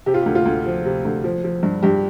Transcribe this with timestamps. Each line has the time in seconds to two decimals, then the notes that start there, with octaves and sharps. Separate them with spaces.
0.06 C3 G4
0.14 F4
0.21 G4
0.26 D2
0.35 F4
0.45 D2
0.66 F3
0.85 C3
1.05 D2
1.24 F3
1.44 F3
1.63 G2
1.83 G2 G4